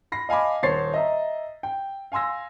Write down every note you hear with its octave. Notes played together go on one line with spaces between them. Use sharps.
B5 A#6 C7
D#5 F5 G#5 A5 B5 D6
D#1 C5 C#5 A6 C7
D#5 E5 A#5
G5
F5 G#5 C6 E6 A#6